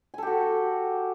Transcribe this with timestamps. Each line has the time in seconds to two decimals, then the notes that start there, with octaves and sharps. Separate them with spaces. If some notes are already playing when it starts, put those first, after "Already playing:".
0.14 G#5
0.18 A4
0.23 G4
0.27 F#4